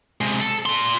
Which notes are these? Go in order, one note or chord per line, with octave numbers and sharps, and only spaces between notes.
C3 G#3
A4
A#2 C6